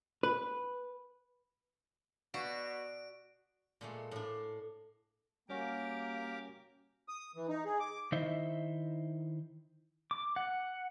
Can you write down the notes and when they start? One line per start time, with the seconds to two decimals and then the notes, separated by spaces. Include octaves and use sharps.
0.23 B4
2.34 B2 F#4 D5 D7
3.81 A#2 G#3 A3
4.11 A2 D4
5.49 G3 A#3 C#4 F#4 G4 A#4 D6
7.08 D#6
7.36 E3
7.49 D#4
7.65 G#4
7.80 D6
8.12 D#3 D#4 E4 C5 D#5 E5
10.11 D6
10.36 F#5